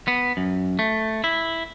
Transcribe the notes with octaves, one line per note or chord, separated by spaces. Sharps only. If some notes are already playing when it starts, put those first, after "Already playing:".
B3
F#2
A3
E4